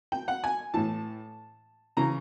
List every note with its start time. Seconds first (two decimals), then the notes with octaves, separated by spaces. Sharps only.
0.12 G5
0.28 F#5
0.44 G#5
0.74 A2 E3 A5
1.97 C#3 E3 A#5